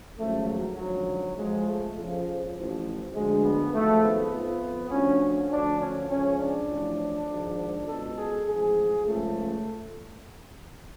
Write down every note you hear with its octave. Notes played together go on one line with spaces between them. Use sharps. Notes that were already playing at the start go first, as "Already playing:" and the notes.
G#1 F#2 C#3 F3 A3
F#3
G#1 F#2 D3 F3 F#3
F2 F3 G#3
A3
F2 C#3 F3
A1 A2 F3
D2 D3 F3 G#3
B3
G#1 G#2 F3 A3
B3
F2 F3
D2 D3 F3 C#4
C#4
D2 D3 F3 D4
C#4
C#2 C#3 F3 C#4
D4
A1 A2 F3
G#1 G#2 F3
C#2 B2 A4
G#4
A1 G#2 F3 G#4
C#2 C#3 F3 A3